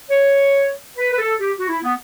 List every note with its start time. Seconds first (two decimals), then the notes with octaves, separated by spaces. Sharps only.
0.10 C#5
0.97 B4
1.13 B4
1.18 A4
1.40 G4
1.59 F#4
1.69 E4
1.84 B3